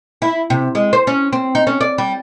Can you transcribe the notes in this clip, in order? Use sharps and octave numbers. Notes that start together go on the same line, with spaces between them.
E4
C3
G#3
C5
C#4
C4
D#4
C#4
D5
G3